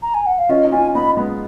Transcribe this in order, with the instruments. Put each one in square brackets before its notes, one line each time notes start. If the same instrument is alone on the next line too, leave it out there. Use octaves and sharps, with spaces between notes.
[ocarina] A#5
G#5
F#5
F5
[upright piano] C#4 F4 [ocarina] D#5
[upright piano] D#4
[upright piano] C#4 F4 [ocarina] G#5
[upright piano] B3 D#4 [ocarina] B5
[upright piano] G#3 B3